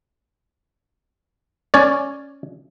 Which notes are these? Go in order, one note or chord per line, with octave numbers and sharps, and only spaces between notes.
C#4 C#5 D5